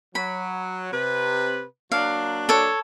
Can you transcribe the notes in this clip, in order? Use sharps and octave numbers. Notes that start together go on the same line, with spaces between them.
F#3 B5
C3 B4
F#3 A#3 D4 F5
A4 C#5